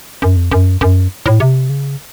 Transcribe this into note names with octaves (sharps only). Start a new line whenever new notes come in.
F#2
F2
F#2
F#2
A2
C3
C#3